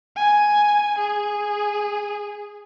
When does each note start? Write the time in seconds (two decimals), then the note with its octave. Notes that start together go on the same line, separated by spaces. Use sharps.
0.16 G#5
0.98 G#4